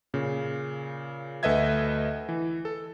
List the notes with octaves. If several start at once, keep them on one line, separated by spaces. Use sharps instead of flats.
A#2 C#3
D2 A4 B4 D#5 E5 G#6
E3
A4